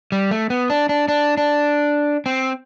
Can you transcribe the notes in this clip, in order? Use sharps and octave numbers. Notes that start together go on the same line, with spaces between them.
G3
A3
B3
D4
D4
D4
D4
C4